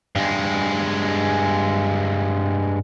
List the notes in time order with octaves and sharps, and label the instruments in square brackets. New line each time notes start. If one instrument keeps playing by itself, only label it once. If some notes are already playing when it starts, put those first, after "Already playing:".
[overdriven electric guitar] G2 G#3